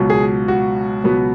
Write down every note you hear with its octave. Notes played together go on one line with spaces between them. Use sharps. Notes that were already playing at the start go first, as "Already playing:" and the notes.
Already playing: C#2 B2 F#3
G#4
F#4
C#2 B2 F#3 B3